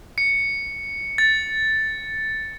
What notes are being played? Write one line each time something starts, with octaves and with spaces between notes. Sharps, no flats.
C#7
A6